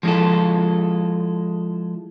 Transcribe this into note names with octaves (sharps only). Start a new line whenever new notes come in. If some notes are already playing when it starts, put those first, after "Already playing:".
F3 G#3 E4 F4 A4